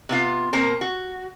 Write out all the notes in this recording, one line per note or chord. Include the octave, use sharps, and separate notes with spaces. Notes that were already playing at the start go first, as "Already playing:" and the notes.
C3 B3 F4
B2 A#3 C4 A#4
F#4